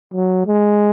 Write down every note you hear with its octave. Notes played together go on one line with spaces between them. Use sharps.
F#3
G#3